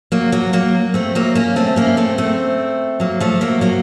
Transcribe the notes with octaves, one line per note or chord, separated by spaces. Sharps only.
F#3 A#3
F#3 A#3
F#3 A#3
A3 C4
F#3 A#3
A#3 C#4
A3 C4
A#3 C#4
A3 C4
A3 C4
F#3 A#3
F3 A3
F#3 A#3
F#3 A#3